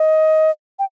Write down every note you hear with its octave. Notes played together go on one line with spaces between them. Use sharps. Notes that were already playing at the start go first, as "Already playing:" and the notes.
Already playing: D#5
G5